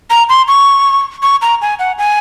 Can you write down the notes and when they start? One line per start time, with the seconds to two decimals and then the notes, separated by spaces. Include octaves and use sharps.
0.10 A#5
0.29 C6
0.48 C#6
1.23 C#6
1.42 A#5
1.61 G#5
1.79 F#5
1.98 G#5